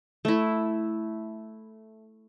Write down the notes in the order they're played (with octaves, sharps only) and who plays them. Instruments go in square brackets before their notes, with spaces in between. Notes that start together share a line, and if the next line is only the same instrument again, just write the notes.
[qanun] A3 E4